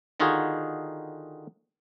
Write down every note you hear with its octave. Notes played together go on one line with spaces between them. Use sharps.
D3 D#3 D#4 F4 F#4 G#4